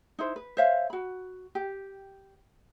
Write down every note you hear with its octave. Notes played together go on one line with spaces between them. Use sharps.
D#4 E4 C5
B4
C5 C#5 E5 F5
F#4 B5
G4